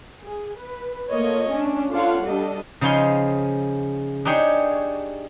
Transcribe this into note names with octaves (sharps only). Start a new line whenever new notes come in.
G#4
B4
A3 A#3 F4 C#5 D#5
C#4 D4
D4 F4 A4 C#5 F5 F#5
G3 D4 A4 D#5
C#3 F3 C#4 D#4 G#5 C6
D4 D#4 G4 G#4 C#5